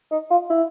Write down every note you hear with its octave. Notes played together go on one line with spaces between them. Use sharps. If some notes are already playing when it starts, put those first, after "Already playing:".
D#4
F4
E4